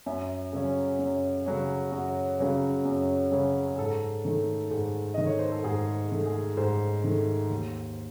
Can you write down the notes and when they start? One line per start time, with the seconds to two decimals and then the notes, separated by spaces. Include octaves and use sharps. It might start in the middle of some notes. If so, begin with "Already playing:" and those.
0.06 F#2 E5
0.53 C#3 F#3 C#4
0.99 F#2
1.46 C#3 F#3 C#4
1.92 F#2 F#4
2.39 C#3 F#3 C#4
2.85 F#2
3.32 C#3 F#3 C#4
3.68 G#4
3.78 G#2 A4
4.25 D#3 A3
4.71 G#2
5.14 D#3 A3 D#5
5.26 C#5
5.39 C5
5.52 A4
5.64 G#2 G#4
6.10 D#3 A3
6.26 G#4
6.57 G#2 C5
7.04 D#3 A3
7.50 D#2